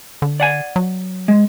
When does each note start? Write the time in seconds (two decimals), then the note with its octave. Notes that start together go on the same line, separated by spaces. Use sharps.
0.22 D3
0.40 D5 F#5 G#5
0.76 F#3
1.28 G#3